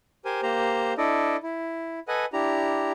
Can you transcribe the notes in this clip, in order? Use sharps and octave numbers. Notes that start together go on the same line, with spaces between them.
G4 A#4 C5 G#5
A#3 G4 C5 A#5
D4 E4 A4 D5 D#5
E4
A4 B4 D#5 F#5 G#5
D4 E4 G4 A#5